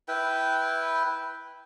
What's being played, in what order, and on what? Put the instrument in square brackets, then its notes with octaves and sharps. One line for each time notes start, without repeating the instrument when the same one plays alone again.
[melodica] E4 B4 G5